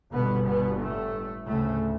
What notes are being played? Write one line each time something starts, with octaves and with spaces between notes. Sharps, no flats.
G1 G2 B2 B3
B2 B3
A2 A3
D2 A2 C#3 A3